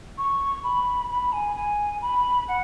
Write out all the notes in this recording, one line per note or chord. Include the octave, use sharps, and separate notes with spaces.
C#6
B5
B5
G#5
G#5
B5
F#5